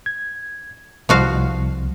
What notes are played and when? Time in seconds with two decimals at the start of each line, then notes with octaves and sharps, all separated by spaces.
0.06 G#6
1.09 C2 F3 F#4 F5